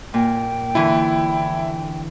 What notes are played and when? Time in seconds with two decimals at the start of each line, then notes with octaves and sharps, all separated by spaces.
0.14 A#2 G5
0.75 D3 E3 E4